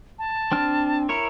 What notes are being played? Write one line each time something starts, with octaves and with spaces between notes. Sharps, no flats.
A5
C4 D4 F6
E4 A#4 C#5 C#7